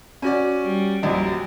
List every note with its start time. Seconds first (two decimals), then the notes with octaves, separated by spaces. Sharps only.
0.22 C#4 F#4 D5
0.63 G3
1.03 A#1 F#2 G3